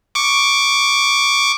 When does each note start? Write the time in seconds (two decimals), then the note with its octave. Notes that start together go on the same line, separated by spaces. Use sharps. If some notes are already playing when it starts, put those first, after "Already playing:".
0.15 C#6 D6